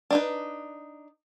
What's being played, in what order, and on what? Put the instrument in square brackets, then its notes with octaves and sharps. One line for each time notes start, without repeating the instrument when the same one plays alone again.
[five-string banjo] D4 D#4 B4